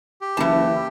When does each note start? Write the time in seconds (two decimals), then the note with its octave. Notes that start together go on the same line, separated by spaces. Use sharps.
0.21 G4
0.37 F#1 E3 A5